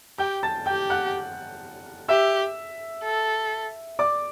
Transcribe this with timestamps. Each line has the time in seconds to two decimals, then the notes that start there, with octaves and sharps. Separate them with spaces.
0.19 G4 G5 G6
0.43 A5 A6
0.66 G4 G5 G6
0.90 F#5 F#6
2.09 G4 E5 E6
3.04 A4
3.99 D5 D6